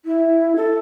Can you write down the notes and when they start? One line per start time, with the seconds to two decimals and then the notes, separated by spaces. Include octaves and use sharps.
0.05 E4
0.56 A4